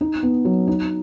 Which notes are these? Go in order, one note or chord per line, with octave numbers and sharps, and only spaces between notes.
D#4
B3
F#3
D#4